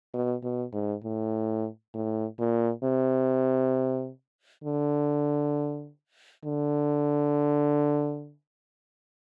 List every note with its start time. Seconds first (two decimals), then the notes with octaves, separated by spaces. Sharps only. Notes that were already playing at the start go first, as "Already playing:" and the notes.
0.14 B2
0.43 B2
0.73 G#2
1.04 A2
1.94 A2
2.39 A#2
2.84 C3
4.64 D3
6.45 D3